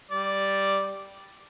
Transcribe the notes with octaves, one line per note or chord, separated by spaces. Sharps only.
G3 D5